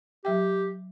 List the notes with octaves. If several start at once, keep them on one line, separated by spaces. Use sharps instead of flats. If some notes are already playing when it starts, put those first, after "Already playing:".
F#3 G4 E5 G5